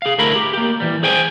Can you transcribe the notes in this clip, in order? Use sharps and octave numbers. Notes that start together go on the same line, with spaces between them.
G#4 F5
D2 A2 A3 E4 A#4 B5
G4
A#3 G4
E3 F3 G3
G#4 C5 G5 G#5